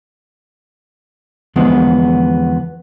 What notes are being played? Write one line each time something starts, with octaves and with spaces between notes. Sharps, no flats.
E2 D3 F3 G#3 B3